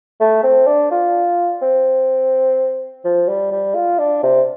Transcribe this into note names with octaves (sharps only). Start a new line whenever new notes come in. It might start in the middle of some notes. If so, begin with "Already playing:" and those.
A3
C4
D4
F4
C4
F3
G3
G3
F4
D4
C3